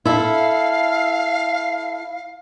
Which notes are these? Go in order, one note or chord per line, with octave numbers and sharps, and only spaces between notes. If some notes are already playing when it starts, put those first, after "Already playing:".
E4 A4 F5